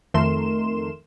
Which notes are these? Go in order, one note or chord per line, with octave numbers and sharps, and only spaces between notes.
F2 D#3 A3 A#4 C6 E7